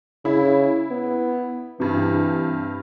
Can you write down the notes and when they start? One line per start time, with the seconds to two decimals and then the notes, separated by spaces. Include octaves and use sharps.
0.25 C#3 E4
0.91 B3
1.80 G2 C3 E3